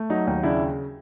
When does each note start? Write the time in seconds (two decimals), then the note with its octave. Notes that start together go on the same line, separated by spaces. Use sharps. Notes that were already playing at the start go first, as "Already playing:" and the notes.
Already playing: A3
0.10 F#3 D#4
0.27 D#2 D#4
0.43 C#3 D4 E4